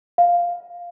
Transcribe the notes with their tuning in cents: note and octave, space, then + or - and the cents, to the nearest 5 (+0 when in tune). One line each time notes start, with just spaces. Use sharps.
F5 +0